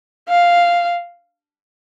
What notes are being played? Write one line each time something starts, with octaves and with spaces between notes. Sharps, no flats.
F5